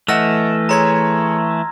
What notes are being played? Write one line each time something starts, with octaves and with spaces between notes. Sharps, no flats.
E3 A3 D#5 F#5 E6 F6 A#6
G#4 C#5 A#5 C6 G#6